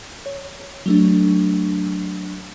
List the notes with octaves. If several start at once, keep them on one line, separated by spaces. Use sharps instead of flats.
C#5
F#3 A3 D4